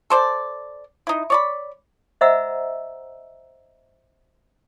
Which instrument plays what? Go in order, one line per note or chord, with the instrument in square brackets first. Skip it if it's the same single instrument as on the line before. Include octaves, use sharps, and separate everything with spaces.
[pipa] A4 C5 D5
D#4 E4
C#5 D5 B5
[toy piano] C5 D#5 E5 F#5 A#5 E6